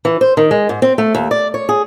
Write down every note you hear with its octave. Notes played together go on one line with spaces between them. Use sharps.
E3
C5
D#3
G#3
G#2
C4
A3
D#2
D5
C#5
G#4